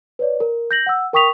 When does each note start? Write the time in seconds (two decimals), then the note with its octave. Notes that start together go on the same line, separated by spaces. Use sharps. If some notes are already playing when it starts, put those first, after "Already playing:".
0.19 B4 C#5 D5
0.40 A#4
0.71 G6 A#6 F#7
0.86 F#5 E6
1.13 A#4 G5 C#6 D#6 B6 F7